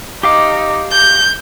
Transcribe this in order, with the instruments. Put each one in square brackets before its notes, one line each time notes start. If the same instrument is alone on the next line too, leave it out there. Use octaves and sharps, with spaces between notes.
[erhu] D#4 [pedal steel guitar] G4 F5 D6
[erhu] G6